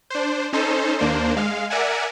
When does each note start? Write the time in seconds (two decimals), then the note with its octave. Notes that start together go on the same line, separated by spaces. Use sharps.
0.10 D4 C5
0.53 C#4 D#4 A4 C5
0.99 D#2 A#3 D4 C5
1.37 G#3 F5
1.70 A#4 D5 E5 F#5 G#5